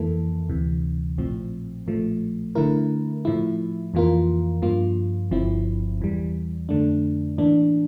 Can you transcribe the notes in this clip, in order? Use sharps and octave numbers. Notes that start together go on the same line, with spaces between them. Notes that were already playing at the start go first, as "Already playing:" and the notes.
Already playing: F2 E3 A#3 E4 A4
D2 C3 E3
A#1 A2 F3 C4
A#1 A2 F3 A3
D3 A3 E4 A#4
A2 F3 A3 E4
F2 E3 A#3 F4 A#4
G2 F3 A#3 F4
G1 G2 F3 C4 E4
E2 E3 G3
F2 D3 A3 D4
A2 E3 A#3 D4